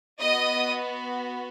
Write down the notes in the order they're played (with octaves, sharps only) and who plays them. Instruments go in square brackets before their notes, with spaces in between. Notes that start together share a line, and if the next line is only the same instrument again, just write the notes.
[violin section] B3 F#4 D#5 D#6